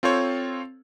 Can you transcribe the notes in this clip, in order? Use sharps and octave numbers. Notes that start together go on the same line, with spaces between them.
C4 F4 A4 C5 C#5